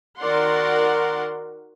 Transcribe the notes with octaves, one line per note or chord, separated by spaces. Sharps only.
D#3 F#4 A#4 D5 F#5 C6